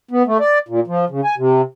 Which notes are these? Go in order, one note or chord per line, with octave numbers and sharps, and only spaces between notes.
B3
A3
D5
A#2
F3
C#3
G#5
C3